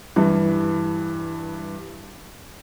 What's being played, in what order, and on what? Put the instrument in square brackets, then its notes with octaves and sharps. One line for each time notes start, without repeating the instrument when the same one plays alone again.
[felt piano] G2 E3